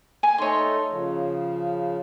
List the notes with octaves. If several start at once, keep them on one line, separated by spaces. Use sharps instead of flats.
G#5
A3 D#4 A4 C#5 C6
C#3 F3